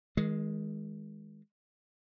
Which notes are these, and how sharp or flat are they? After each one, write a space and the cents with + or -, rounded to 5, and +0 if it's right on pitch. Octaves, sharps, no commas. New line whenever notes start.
D#3 +40 G#3 +0